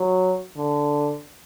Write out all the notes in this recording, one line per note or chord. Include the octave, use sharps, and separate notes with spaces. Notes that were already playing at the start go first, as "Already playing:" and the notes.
Already playing: F#3
D3